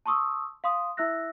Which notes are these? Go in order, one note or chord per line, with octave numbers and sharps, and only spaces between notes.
A5 C6 C#6 D#6 E6
F5 C6 D#6
E4 E5 E6 F#6 A#6